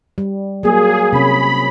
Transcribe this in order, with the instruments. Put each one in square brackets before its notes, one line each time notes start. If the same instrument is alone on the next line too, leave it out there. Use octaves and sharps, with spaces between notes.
[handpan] G3
[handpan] F#3 A#3 [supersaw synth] G#4
[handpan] C3 C#4 [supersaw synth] B5